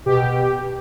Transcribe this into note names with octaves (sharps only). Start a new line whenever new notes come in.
B2 G4